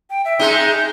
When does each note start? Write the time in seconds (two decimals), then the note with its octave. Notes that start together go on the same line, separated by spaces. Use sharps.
0.10 G5
0.25 E5
0.39 G#3 D#4
0.71 G6